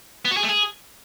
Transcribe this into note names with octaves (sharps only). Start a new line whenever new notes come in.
B3
F#4
G#4
A3
G#4